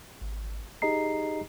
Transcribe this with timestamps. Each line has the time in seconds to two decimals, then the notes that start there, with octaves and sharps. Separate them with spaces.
0.21 G#1
0.82 D#4 G4 G#4 D#5 A#5 C7